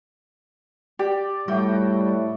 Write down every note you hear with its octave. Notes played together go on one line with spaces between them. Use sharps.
G4 D5
A2 G3 F#4 E5 G5